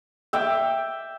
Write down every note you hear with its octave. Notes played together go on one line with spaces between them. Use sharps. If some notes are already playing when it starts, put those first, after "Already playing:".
E5 G5 D6